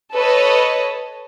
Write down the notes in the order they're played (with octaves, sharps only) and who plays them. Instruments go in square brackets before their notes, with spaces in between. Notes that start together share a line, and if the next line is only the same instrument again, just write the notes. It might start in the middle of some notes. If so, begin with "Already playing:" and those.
[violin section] A4 B4 C#5 D#5